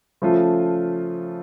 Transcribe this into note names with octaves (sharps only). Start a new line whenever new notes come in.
C#3 F3 A3 F4